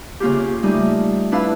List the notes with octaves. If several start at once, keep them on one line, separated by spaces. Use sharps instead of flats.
C#3 A#3 F4 G4
G3 A3 D#4
D4 E4 B4 F5 E6